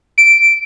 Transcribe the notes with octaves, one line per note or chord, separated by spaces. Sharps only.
D7